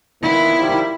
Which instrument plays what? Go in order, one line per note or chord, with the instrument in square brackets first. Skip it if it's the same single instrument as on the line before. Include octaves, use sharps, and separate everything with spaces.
[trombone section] A#2 D#3 B3 [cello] E4
[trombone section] D#3 F3 G3